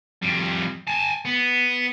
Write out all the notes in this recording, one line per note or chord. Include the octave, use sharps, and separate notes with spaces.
F2 G3
G#5 A5
B3